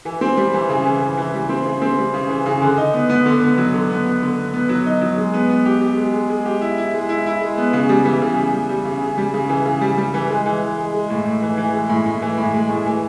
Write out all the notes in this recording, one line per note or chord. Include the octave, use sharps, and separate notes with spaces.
E3
C4
G3
E3
C#3
E3
E3
E3
G3
C4
C#3
C4
G3
C#3
E3
C#3
D3
D#4
B3
B3
D3
B3
F#3
D3
B3
B3
D3
B3
B3
F#3
D#4
F#3
G#3
B3
B3
G4
G4
G#3
G#3
G#3
G4
E4
E4
G#3
E4
E4
G#3
B3
C#3
G3
E3
C#3
G3
G3
G3
C#3
C#3
G3
C#3
E3
C#3
G3
G3
E3
G#3
E3
G#3
G#3
G#3
A2
A2
E3
E3
G#3
A2
A2
E3
A2
G#3
A2
E3